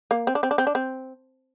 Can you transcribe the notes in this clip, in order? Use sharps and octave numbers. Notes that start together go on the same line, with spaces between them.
A#3
C4
D4
C4
D4
C4
D4
C4